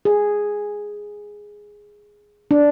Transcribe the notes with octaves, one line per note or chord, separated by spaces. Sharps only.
G#4
D4